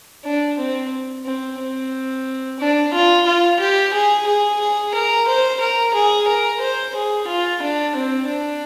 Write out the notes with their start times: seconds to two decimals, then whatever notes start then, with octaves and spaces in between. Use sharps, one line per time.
0.25 D4
0.58 C4
1.25 C4
1.59 C4
2.59 D4
2.93 F4
3.26 F4
3.60 G4
3.93 G#4
4.26 G#4
4.60 G#4
4.94 A#4
5.27 C5
5.60 A#4
5.94 G#4
6.27 A#4
6.60 C5
6.95 G#4
7.27 F4
7.62 D4
7.95 C4
8.28 D4